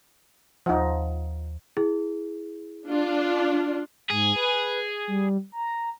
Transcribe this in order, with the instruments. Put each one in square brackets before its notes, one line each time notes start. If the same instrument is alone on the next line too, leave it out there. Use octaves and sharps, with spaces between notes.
[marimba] D#2 F#5 [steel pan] F3 D#4
[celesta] E4 G#4
[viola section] D4 F4
[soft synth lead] G#2 [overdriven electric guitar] G#4
[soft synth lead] B4
G3
A#5